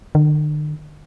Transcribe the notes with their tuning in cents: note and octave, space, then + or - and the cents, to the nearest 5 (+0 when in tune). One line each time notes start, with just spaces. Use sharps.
D3 +45